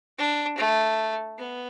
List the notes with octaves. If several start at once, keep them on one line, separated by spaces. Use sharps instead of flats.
D4
A3
B3